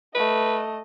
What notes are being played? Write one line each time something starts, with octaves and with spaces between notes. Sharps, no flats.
A3 B4 D#5